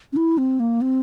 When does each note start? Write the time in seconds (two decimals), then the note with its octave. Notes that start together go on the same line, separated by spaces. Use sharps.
0.13 C#4
0.17 E4
0.38 C4
0.60 A#3
0.81 C4